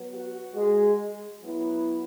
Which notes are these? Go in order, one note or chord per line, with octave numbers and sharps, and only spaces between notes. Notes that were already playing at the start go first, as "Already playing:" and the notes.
Already playing: F#3 B3
F#4
G#3 G#4
F#3 B3 E4